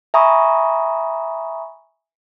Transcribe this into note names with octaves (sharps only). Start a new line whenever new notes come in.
E5 G#5 A#5 B5 C#6 D#6